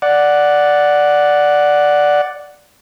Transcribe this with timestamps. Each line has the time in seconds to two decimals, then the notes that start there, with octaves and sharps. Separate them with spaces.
0.02 D5 F#5